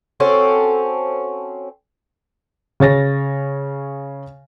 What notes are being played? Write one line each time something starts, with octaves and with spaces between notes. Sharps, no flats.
C4 C#4 F#4 A4
C#3 C#5 A6 A#6